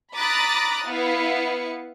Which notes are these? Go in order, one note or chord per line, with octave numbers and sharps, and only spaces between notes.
A#5 B5 D6 D#6 F#6 A6
B3 E4 B4 F5 C#7